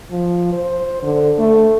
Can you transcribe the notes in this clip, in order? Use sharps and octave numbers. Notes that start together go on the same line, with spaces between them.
F3
C5
D3
A3